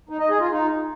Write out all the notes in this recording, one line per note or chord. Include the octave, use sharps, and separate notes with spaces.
D#4
D#5
G#4
F4
D#4